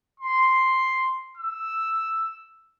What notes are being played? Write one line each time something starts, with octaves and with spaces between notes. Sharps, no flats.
C6
E6